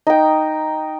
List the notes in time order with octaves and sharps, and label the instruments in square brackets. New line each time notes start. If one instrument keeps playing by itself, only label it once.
[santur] D#4 G5